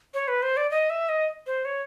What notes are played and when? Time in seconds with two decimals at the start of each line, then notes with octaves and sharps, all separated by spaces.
0.14 C#5
0.28 B4
0.43 C5
0.57 D5
0.71 D#5
0.90 E5
1.09 D#5
1.47 C5
1.65 C#5